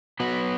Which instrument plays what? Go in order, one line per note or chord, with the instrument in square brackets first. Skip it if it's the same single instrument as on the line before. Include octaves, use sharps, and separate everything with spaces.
[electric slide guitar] F#3 B3 F#4